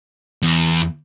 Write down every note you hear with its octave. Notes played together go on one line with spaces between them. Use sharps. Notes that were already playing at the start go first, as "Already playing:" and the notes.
E2